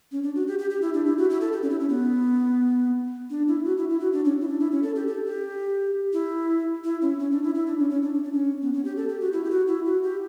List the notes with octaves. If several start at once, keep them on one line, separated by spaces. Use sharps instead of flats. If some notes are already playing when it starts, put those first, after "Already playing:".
C#4
D4
F#4
G4
G4
G4
E4
D4
E4
F#4
E4
A4
G4
C#4
E4
C#4
B3
D4
E4
F#4
E4
E4
F#4
D4
C#4
E4
D4
E4
C#4
A4
G4
A4
G4
E4
E4
C#4
C#4
D4
E4
E4
D4
C#4
C#4
D4
C#4
D4
C#4
B3
C#4
G4
A4
G4
F#4
E4
G4
F#4
E4
F#4
G4